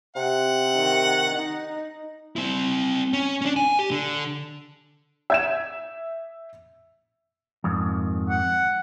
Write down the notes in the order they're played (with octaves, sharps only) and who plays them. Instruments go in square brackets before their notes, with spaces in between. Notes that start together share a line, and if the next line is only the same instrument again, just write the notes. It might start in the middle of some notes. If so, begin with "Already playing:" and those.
[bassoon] C3 [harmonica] F#5
[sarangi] D#3
D#4
[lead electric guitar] C4 E4
C#4
C#4 D4
G#5
G4
D3
[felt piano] E5 G#6 E7
[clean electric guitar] F2 G#2 D#3
[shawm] F#5